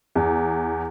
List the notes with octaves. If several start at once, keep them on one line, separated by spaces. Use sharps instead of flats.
E2